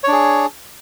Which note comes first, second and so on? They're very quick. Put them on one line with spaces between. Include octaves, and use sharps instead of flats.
C#5 D4 G#4